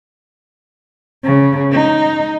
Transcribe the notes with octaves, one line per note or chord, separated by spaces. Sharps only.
C#3
D#4